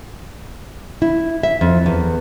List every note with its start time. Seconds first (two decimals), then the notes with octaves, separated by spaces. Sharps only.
1.02 E4
1.43 E5
1.61 F2
1.86 E2